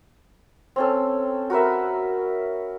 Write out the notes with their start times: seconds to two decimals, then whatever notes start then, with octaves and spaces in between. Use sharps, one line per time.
0.76 C4 C#4 A4
1.50 F#4 A#4 B4 E5